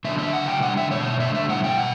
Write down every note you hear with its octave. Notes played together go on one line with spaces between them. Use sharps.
D3 F#3 A3 E5
E5
C#3 F#3 A3 F#5
G5
D3 G3 F#5
E5
B2 A3 C#5
D3 A3 E5
E5
A2 G3 F#5
G5
B2 F#5